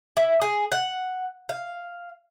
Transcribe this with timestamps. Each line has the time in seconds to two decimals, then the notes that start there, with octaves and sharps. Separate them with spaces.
0.17 E4
0.41 G#4
0.72 F#5
1.49 F5